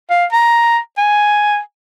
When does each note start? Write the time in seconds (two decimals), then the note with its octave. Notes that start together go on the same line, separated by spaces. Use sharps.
0.10 F5
0.32 A#5
0.97 G#5